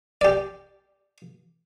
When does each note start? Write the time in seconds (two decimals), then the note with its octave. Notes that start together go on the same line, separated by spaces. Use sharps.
0.21 G4 D5